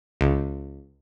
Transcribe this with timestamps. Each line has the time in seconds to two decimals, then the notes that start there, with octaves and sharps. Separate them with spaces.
0.21 C#2